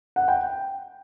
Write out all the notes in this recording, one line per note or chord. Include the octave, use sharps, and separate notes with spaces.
F#5
G5